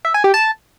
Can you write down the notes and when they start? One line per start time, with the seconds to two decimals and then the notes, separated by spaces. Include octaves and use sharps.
0.05 E5
0.14 G#5
0.24 G4
0.34 A5